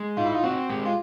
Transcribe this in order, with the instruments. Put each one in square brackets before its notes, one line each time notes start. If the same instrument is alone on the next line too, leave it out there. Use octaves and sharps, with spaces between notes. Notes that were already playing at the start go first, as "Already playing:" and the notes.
Already playing: [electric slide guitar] G#3
[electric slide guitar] D#4 [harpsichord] F4
[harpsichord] E4
F4
[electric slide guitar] C4 [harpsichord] F#4
[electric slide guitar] G#3 [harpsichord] G4
[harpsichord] F4